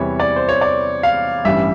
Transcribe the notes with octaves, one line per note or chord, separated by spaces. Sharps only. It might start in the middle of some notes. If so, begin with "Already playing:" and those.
Already playing: E2 C3 E3 G3 C#5
D5
C5
C#5
D5
F5
A1 G2 E3 G3 E5